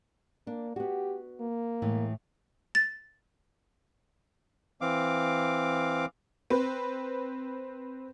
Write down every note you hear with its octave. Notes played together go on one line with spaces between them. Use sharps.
A#3 D4
B3 F#4 G4
A#3
A2 E3 G#3
A6
E3 C4 F5 D6
C4 B4